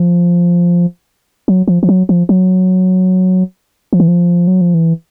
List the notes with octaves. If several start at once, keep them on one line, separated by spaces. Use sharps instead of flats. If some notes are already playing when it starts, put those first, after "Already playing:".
Already playing: F3
F#3
F3
F3
F#3
F3
F#3
F3
E3
F3
F#3
F3
E3